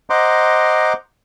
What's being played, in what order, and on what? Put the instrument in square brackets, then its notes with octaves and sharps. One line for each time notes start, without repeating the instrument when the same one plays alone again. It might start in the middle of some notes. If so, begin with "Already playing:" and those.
[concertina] C5 D#5 F#5 A#5 C6 D6